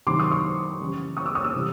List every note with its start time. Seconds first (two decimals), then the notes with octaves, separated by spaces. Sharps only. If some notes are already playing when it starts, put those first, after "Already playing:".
0.06 C3 D#3 F#3 C6 D6
0.19 C#6 D#6
0.31 C#6 D#6
0.80 C#3 E3 G3
1.17 C#6 D#6
1.26 D6 E6
1.35 C#6 D#6
1.44 D6 E6
1.54 C3 E3 G3